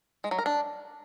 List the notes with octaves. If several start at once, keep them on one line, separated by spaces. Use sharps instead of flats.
G#3
F#3
A#4
D4